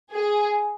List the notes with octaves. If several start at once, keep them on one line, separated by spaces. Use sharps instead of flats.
G#4